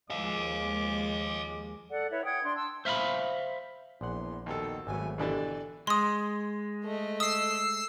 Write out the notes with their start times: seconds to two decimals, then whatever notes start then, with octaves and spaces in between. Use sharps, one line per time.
0.10 D#2 F3 G#3 D#5 F5 D6
1.90 A4 D5 F#5
2.10 E4 B4 C#5 E5
2.24 F#5 G5 D#6 G#6
2.43 D4 C6
2.56 A5 C6 E6
2.85 C5 E5 F5 G#5 B5
4.01 A#1 E2 F#5 C6
4.46 D#2 B2 D#4 A4 G5
4.87 G#1 F#3 A3 B3 G#5
5.18 B2 D3 E3 G4 D5
5.87 G#3 C6 D#6
6.85 A3 D#5
7.20 D#6 E6 C7